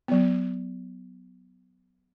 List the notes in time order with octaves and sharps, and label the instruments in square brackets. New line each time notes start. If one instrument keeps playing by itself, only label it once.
[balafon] F#3 B3